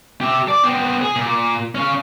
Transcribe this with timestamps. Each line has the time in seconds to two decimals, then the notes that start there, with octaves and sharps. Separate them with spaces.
0.21 G4 E5
0.48 D5
0.64 B3 C4
1.01 G#4
1.16 A#2
1.75 C#4 F5